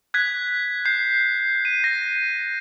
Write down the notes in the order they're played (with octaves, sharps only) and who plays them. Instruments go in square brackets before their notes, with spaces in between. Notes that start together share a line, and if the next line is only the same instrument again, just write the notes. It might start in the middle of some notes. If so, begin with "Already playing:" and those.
[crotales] F#6 G#6 B6
G6 C7
D#7
A#6